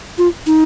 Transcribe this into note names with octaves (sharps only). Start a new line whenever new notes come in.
F4
D#4